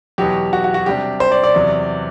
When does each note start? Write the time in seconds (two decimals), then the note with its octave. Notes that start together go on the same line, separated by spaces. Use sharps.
0.18 E2 B2 F#3 G4
0.53 F#4
0.64 F#4
0.74 F#4
0.86 C3 G3 D4 G4
1.20 C5
1.32 D5
1.44 D5
1.54 E2 C3 F#3